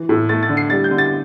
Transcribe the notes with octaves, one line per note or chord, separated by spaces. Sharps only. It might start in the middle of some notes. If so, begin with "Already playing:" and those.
Already playing: E3
A2
A3 A6
A6
D3
C7
G3 A6
G6
D3
A6